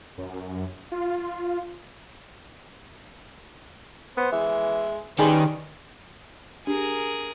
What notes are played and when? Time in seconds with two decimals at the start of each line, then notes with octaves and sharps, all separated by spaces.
0.18 F#2
0.92 F4
4.18 B3 C5
4.32 E3 G#3 E5
5.19 D#3 G3 C#4 D#4 G#4 B4 G#5 C6
6.67 D4 G4 G#4 A#4